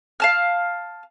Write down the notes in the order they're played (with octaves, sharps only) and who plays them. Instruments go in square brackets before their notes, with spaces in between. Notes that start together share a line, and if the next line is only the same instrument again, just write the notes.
[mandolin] F5 A5 F6